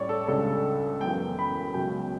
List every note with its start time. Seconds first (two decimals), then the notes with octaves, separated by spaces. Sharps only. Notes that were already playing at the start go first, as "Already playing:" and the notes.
Already playing: A2 G3 C#4 C#5 D5
0.09 A4
0.27 C#2 C#3 G3 D4 A4
1.01 F#2 C#3 E3 B3 G5
1.39 B5
1.74 C#2 B2 F#3 C#4 G5